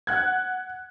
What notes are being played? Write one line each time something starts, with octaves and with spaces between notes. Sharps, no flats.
F#5 F#6 G#6